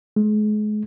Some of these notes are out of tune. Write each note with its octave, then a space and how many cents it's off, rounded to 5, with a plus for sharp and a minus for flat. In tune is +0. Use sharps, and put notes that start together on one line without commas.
G#3 +35